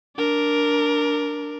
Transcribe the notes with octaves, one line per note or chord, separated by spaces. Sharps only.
D4 A#4